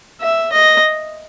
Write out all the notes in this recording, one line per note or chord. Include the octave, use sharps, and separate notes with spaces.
E5
D#5